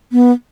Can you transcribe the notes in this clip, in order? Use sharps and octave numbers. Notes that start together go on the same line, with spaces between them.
B3